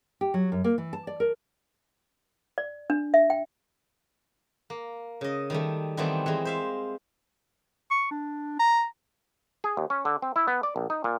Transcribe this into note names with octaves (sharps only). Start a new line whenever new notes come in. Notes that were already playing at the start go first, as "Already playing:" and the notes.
G4
F#3
F#2
A#3
E3
A5
D5
A#4
D5
D4
E5
G5
A#3
C#3 D#5
D#3 G3 A3
D#3 E3 G3 A3 B3 C4
E3 G#3
C5 E5 F5
C#6
D4
A#5
G#4
D#2
C#4
D3
C4
E4
B3
D5
A#1
D#4
A#2